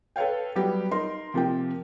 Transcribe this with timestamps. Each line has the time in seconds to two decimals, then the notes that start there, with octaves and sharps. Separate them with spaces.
0.16 A4 B4 C#5 F5 G5
0.55 F#3 G3 B3 G4
0.91 D#4 A#4 C6
1.34 C3 F3 A#3 G4 G5